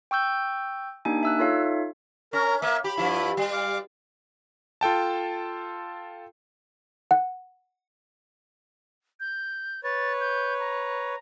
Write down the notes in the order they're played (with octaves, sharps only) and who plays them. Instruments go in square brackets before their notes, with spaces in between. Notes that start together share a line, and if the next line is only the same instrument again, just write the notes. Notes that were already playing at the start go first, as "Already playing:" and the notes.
[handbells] G5 C#6 E6 G6
A#3 D4 D#4 G4 G#5
E5 E6 F#6
D#4 F4 A4 C#5 E5 F5
[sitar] C#4 [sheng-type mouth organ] A#4 A#5
[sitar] A#3 [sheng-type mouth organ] E5
[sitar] G4 [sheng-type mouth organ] B5
[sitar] G2 F3 E4
G3
[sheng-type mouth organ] F5 D6
[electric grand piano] F4 A4 G5 A5
[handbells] F#5
[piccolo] G6
[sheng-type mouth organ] B4 C#5 [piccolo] A6
[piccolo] G6
A#5